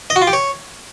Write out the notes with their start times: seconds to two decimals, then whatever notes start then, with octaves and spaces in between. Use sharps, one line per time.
0.10 D#5
0.16 F#4
0.22 F4
0.27 G4
0.33 C#5